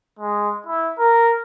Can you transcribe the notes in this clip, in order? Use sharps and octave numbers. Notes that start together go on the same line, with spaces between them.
G#3
E4
A#4